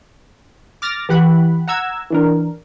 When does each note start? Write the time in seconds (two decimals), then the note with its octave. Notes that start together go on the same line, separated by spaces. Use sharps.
0.82 D6 F6 A6 A#6
1.09 E3 G4 F#5 B5
1.68 F#5 A#5 E6 G#6
2.10 E3 D4 A#4